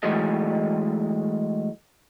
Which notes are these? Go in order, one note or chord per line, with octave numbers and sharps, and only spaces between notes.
E3 F#3 G#3 A3 D#5